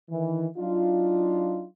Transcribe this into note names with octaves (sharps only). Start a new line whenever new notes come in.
D#3 E3
F#3 D4 D#4 F4